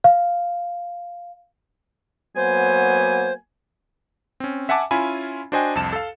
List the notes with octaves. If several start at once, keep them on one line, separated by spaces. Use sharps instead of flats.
F5
F#3 A#3 B3 C5 G#5
C4 C#4
E5 F#5 G#5 A5 D6
C#4 E4 F4 G#5 B5
D4 F#4 C5 D#5 G5 G#5
C2 F2 A5 E7
A4 F5